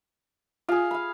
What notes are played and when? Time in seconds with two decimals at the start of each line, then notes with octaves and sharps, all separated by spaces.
0.69 F4 G#4 F5
0.91 F5 B5